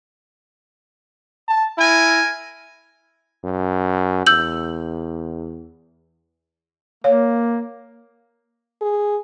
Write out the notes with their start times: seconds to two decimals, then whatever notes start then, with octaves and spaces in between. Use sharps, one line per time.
1.48 A5
1.78 E4 A#4 G#5
3.44 F#2
4.27 E2 E6 G6 F#7
7.04 A#3 C#5 F5
8.82 G#4